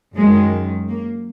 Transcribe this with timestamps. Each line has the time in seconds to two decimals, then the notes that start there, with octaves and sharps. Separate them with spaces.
0.15 F#2 D#3 G#3
0.88 A#3